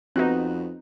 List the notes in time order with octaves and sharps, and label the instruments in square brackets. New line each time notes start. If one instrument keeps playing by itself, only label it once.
[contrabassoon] F2 [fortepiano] B3 F#4 F#6 [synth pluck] C4 D#4